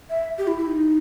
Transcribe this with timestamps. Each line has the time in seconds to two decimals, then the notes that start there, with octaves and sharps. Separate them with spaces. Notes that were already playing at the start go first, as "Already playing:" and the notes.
0.10 E5
0.38 G4
0.47 E4
0.58 E4
0.67 D#4